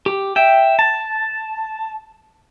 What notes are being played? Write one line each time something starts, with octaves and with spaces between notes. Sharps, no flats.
G4
E5 G5
A5